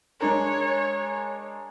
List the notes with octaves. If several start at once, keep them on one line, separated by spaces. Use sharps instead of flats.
G#3 D4 A#4 C#5